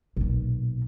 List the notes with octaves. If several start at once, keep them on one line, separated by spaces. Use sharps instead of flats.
B1 A#2